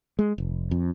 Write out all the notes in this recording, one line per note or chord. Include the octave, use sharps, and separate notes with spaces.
G#3
F1
F2